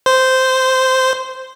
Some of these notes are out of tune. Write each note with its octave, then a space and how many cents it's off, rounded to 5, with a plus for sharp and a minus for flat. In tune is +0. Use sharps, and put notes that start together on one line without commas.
C5 -10